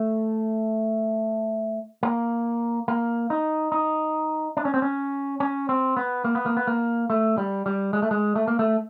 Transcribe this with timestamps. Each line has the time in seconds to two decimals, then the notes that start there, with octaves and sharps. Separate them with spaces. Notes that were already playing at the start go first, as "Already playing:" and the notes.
Already playing: A3
2.03 A#3
2.88 A#3
3.30 D#4
3.72 D#4
4.57 D4
4.65 C#4
4.74 C4
4.82 C#4
5.40 C#4
5.69 C4
5.97 B3
6.24 A#3
6.35 B3
6.46 A#3
6.57 B3
6.67 A#3
7.10 A3
7.38 G3
7.66 G3
7.93 G#3
8.02 A3
8.11 G#3
8.36 A3
8.48 A#3
8.59 A3